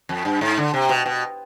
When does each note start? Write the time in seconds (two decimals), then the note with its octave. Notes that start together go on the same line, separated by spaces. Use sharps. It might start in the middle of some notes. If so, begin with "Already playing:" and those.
0.09 F2
0.25 G2
0.41 G#2
0.57 D3
0.74 C3
0.89 B2
1.06 B2